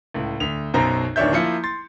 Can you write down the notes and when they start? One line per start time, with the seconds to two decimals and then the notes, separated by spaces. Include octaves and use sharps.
0.14 C#2 A2
0.40 D2 F7
0.74 B1 F#2 B2 C5 A#5
1.16 D1 D#3 D4 C#5 E5 G6
1.33 F3 A#3 E4 F4 C#7
1.64 C6 A6